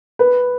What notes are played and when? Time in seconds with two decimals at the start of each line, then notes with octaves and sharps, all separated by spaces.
0.19 B4